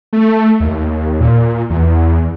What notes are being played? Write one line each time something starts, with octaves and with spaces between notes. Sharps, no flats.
A3
D#2
A#2
E2